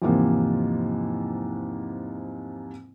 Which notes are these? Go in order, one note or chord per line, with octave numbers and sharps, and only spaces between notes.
E2 G#2 C3 F3 A#3